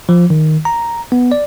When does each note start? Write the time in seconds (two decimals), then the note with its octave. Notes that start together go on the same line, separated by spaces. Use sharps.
0.09 F3
0.30 D#3
0.65 A#5
1.12 B3
1.32 D5